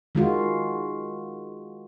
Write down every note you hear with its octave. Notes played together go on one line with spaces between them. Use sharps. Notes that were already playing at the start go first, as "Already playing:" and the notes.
D#3 G#3 F4 F#4